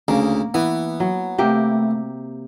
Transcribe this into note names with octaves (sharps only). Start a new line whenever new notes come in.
D2 C#3 A#3
E3 B3
F#3
C3 A3 A#3 G4